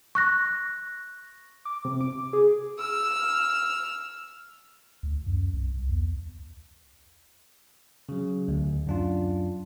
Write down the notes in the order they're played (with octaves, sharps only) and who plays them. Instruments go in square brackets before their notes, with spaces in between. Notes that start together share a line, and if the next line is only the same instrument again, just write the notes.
[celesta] C#6 F#6 A#6
[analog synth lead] D6
C3
D6
G#4
[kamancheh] E6 F6
[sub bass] D2
F#2
C2
E2
[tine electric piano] C#3 F#3
D2
F#2 D4 F4